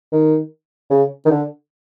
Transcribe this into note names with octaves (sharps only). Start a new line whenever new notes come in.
D#3
C#3
D#3
D3